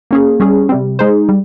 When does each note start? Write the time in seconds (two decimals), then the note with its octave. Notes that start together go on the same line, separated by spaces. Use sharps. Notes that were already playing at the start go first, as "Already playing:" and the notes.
0.11 A#3 C#4 G#4
0.40 G3 C#4 G#4
0.69 C3 G3 C4
0.99 G#3 D#4 G#4 C5
1.29 G3